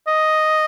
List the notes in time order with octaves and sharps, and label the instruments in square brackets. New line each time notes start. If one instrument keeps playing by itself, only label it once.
[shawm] D#5